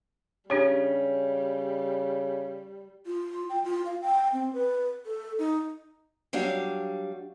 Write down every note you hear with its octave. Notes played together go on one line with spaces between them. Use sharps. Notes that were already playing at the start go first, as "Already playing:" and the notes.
C#3 G3 C#4 D4 G4 C#5
F4
G5
F4
F5
G5
C4
B4
A4
D#4
F#3 G3 D4 F5